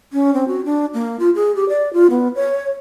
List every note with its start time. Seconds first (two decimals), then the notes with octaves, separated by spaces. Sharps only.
0.13 C#4
0.34 C4
0.48 F#4
0.65 D4
0.94 A#3
1.20 F4
1.35 G#4
1.56 G4
1.69 D5
1.93 F4
2.10 B3
2.36 C#5